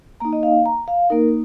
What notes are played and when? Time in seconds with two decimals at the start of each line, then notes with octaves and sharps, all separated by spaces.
0.20 A#3 D#4 A#5
0.33 D#5
0.43 F5
0.66 A#5
0.88 F5
1.10 A#3 D#4 A#4